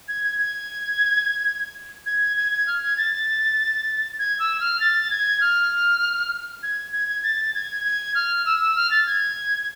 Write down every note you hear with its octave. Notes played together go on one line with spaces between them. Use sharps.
G#6
G#6
G#6
G#6
G#6
G#6
F6
G#6
A6
G#6
E6
F6
A6
G#6
F6
G#6
G#6
G#6
A6
G#6
G#6
F6
E6
E6
F6
A6
G#6